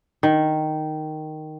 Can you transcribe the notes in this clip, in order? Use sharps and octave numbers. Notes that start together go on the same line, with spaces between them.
D#3